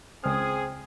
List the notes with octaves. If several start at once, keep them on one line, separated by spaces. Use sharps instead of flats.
C#2 C4 G#4 D#6 F6